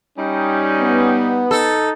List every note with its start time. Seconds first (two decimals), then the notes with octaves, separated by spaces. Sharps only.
0.18 G3 C#4 D#4
0.80 B3
1.51 D#4 A4